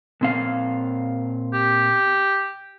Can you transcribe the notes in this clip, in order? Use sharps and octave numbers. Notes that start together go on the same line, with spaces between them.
A#2 C4 F5
G4